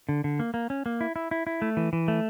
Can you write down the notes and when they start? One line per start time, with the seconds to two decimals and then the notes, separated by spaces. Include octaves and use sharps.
0.09 D3
0.24 D3
0.39 A#3
0.54 A#3
0.70 C#4
0.86 A#3
1.01 E4
1.16 E4
1.31 E4
1.47 E4
1.62 A3
1.77 E3
1.93 E3
2.08 A3